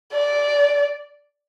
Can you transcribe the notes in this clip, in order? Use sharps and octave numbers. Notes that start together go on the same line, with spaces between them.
D5